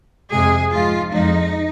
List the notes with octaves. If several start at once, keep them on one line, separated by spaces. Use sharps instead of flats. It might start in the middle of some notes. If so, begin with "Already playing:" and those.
F2 C3 G#3 G#4
G#2 F3 G#3 F4
F2 F3 G#3 D#4